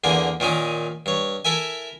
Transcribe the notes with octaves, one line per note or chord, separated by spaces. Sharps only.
E2 D3 A#3 G#5
A#2 D#3 C#4 D#4
G2 C#5
E4 A4 A#4 E5 G#5